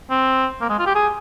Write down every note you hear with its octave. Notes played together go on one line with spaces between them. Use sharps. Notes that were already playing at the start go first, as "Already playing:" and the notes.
C4
A#3
G#3
F4
G4
G#4